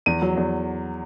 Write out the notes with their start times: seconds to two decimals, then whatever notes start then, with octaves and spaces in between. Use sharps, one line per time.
0.06 E2 D#7
0.22 F#3
0.37 E2